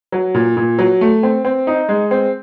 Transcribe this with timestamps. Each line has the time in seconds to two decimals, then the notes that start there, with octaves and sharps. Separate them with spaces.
0.12 F#3
0.34 A#2
0.57 A#2
0.79 F#3
1.01 A3
1.23 C4
1.45 C4
1.67 D#4
1.89 G#3
2.11 C4